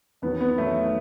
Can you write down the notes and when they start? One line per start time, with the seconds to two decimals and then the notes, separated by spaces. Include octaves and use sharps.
0.22 E2 D#3 F#3 B3
0.41 B3
0.58 E2 D#3 F#3 A3